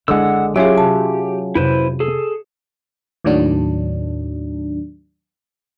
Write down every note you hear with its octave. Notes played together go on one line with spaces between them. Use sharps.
F#1 D3 G#3 E4 F#5 E6
F#3 C#4 F4 G4 G#4 C#5 E5
C3 A5
F2 C3 E4 B4 C5
G#4 A4
D#2 A2 D#3 F#3 D4